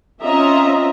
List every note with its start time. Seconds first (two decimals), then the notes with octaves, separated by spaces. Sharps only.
0.22 C4 C#4 F4 D#5 E5 A#5